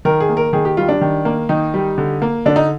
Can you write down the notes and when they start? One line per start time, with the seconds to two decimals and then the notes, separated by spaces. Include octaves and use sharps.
0.05 D#3 A#4
0.20 G#4
0.29 A#3
0.37 A#4
0.53 D#3 G#4
0.65 G4
0.77 G3 F4
0.89 D4
1.01 D#3
1.25 A#3
1.49 D#3 D#4
1.74 G3
1.98 D3
2.22 A#3
2.46 D3 D4
2.56 D#4